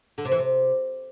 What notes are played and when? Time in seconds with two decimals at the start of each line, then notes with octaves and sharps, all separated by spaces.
0.18 D3
0.25 C3
0.32 E3
0.39 C3